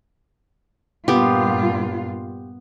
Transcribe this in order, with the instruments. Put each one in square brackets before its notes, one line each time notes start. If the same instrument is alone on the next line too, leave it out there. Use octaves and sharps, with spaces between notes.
[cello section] G2 A#2 F4 [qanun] B3 G4